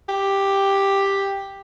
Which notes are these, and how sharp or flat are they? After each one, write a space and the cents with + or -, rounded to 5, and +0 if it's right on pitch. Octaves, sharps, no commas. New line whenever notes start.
G4 +5